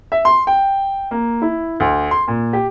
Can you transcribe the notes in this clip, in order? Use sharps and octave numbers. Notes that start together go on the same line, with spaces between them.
E5
C6
G5
A#3
E4
D2
C6
A#2
G4